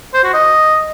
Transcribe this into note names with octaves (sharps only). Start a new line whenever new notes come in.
C5
F#4
D#5